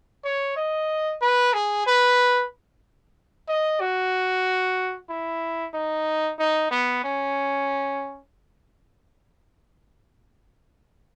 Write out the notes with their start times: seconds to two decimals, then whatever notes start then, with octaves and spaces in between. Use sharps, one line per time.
0.24 C#5
0.57 D#5
1.21 B4
1.54 G#4
1.87 B4
3.48 D#5
3.81 F#4
5.09 E4
5.74 D#4
6.39 D#4
6.71 B3
7.04 C#4